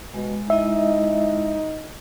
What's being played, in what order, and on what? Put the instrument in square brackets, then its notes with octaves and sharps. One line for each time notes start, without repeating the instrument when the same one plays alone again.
[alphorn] B2 [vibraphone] G#3
[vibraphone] G#3 E4 D#5 [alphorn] D#4 [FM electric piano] E5